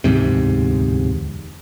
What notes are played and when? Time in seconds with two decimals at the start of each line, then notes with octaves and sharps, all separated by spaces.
0.04 D1 E2 G#2 C3